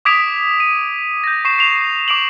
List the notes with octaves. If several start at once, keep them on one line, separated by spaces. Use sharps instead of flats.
D6 D#6 G#6 B6 D7 F7
D#7
G6 A#6
C#6 C7 E7
C7 F7
D6 D7 F7 F#7